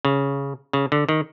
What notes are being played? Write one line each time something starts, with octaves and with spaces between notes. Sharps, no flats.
C#3
C#3
D3
D#3